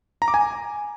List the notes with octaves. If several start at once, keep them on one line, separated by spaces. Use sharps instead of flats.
A#5
D6
G#5